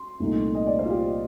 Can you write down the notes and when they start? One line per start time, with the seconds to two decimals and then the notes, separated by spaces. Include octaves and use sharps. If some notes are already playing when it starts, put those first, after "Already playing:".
Already playing: C6
0.20 C2 A#2 A3 D#4
0.55 D#5
0.66 D5
0.79 C5
0.85 F4
0.90 G4